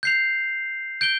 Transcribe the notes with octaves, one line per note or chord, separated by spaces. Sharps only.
G6 C7 F7
G6 D7 G7